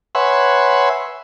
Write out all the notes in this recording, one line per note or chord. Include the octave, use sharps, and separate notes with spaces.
B4 C#5 E5 F#5 G#5 C6